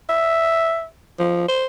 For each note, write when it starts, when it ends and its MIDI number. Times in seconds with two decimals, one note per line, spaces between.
0.09 0.85 76
1.19 1.48 53
1.49 1.66 72